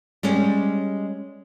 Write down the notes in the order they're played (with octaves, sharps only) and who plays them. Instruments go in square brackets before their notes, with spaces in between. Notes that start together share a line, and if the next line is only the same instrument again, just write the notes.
[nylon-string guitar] G3 G#3 C#4